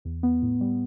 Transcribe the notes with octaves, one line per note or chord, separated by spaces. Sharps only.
E2
B3
A2
G3